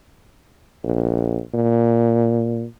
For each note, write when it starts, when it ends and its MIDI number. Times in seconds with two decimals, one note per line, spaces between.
0.84 1.41 34
1.54 2.65 46